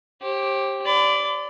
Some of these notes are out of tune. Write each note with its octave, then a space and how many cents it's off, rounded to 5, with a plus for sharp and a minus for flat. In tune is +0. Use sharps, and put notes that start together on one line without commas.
G4 +0 C5 +40
D5 -10 B5 +35